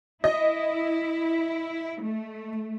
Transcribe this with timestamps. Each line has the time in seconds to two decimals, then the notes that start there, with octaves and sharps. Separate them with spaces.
0.24 E4 D#5
2.01 A3